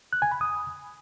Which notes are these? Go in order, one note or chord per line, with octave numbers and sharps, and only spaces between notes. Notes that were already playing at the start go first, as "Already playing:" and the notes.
F#6
G#5
B5
D#6